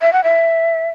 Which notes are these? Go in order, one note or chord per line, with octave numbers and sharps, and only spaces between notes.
E5
F#5
E5